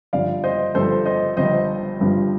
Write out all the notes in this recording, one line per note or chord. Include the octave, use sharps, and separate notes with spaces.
G1 G2 F3 D5 F5
C5 D#5
G1 G2 F3 A4 C5
C5 D#5
G1 G2 F3 C5 D#5
G1 G2 F3